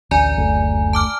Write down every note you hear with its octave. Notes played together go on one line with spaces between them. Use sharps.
A1 D2 D5 G#5 A#5
F#1 D2 A3
A5 D6 F6